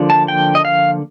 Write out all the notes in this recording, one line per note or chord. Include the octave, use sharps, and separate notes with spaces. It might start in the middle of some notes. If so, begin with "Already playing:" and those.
Already playing: D3 F3 A#3 D4
A5
G5
D#5
F5